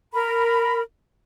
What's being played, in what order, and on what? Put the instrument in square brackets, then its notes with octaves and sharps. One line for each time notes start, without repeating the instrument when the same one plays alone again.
[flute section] A#4 B5